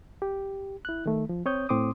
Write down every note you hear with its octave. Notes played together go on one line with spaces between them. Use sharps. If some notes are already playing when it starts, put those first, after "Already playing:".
G4
E4 F#6
D#3 A3
F3
C4 C#5 D#6 G6
A2 C4 C6 D6 D#6